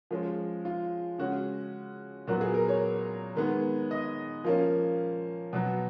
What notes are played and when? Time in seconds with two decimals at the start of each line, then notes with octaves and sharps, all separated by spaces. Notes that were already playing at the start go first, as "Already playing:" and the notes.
0.11 F3 G#3 C#4
0.65 F4
1.18 C#3 G#3 C#4 F#4
2.27 A#2 F#3 B3 F#4
2.41 G#4
2.54 A#4
2.69 C#5
3.36 D#3 G#3 B3
3.91 D#5
4.44 F3 A#3 C#4
5.53 B2 F#3 B3